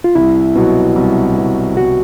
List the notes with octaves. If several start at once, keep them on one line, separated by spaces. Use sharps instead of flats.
F4
C2 E4
B2 F#3
C2
B2 F#3
C2 F#4